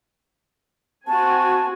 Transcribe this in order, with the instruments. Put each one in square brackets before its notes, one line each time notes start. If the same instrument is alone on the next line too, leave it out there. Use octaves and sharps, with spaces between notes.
[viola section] C4 F#4 G#5 [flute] A5